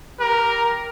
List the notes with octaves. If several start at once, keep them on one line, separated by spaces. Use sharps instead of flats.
G4 A#4